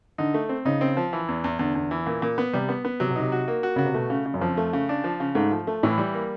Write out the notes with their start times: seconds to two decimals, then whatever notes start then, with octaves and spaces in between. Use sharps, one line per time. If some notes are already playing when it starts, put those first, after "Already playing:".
0.18 D3 D#4
0.34 A3
0.49 C4
0.65 C#3 D#4
0.81 C4
0.97 F3
1.13 E3
1.28 E2
1.44 E2
1.59 E2 D3
1.75 E2
1.91 E3
2.07 A#2
2.22 A#2
2.38 B3
2.53 C3 G3
2.69 B3
2.85 B3
3.00 C3 F#3
3.10 B2
3.16 C3 D#4
3.32 F#4
3.48 A#3
3.63 F#4
3.76 C#3 F#4
3.85 C3
3.94 B2 A3
4.10 C#3
4.26 C#3
4.34 F#2
4.41 F2 F3
4.57 A3
4.73 C#3
4.89 D4
5.04 F3
5.20 C#3
5.35 G#2 A3
5.51 F3
5.67 A3
5.83 A2 E3
5.98 G3
6.14 A#3